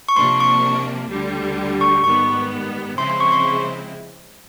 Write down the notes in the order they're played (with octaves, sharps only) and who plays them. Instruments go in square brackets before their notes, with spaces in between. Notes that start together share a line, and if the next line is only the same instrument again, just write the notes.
[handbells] C#6
[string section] C3 F3 A#3 D4 [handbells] C6
[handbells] C#6
[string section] D2 D3 G3
[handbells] C#6
[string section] G#2 D#3 G3 B3 [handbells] C#6
[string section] C#3 F3 G#3 C4 E4 [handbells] C6
[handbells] C6
C#6
C6